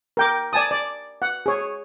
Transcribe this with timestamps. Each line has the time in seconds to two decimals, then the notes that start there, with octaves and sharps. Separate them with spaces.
0.17 A#4 G5 D6
0.53 D5 G#5 A5 D#6
0.71 D5
1.22 F#5
1.46 G#4 C#5